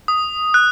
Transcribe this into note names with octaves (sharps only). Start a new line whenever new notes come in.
D#6
F#6